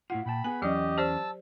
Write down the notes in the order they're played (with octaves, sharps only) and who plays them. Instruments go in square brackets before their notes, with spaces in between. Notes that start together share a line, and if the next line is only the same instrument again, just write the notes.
[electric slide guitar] A2 E4 F4 [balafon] F#5
[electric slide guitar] A#2 G5 A5 [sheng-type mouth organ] B5
[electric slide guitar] B3 G#4 [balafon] G#5
[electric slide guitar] E2 C#4 [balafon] F#3 D5 [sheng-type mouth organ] G4 D#5
[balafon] G4 C5 D5 [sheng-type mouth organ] A5 E6